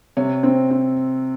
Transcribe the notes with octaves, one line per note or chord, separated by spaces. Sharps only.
C3 C#5
C4
C4